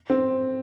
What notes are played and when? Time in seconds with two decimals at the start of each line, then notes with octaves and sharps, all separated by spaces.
0.10 C4